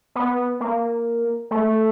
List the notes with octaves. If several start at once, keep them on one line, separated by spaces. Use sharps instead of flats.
B3
A#3
A3